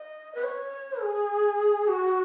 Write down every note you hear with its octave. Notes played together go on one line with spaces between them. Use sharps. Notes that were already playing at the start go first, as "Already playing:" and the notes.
Already playing: D#5
B4
C#5
G#4
F#4